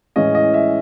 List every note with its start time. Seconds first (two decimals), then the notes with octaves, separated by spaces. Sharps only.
0.16 A2 E3 G#3 C#4 D#5
0.35 D#5
0.54 E5